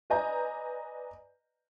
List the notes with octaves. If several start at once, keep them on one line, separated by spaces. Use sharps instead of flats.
B4 D5 D#5 G#5 A#5 G6